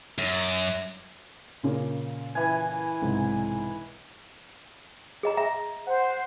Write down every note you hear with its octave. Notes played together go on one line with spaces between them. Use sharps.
F#2
A#2 C#3 A#3
E3 G#5
B1 G#2 C3
G#4 D#5 A#5
E5 A#5
C5 F#5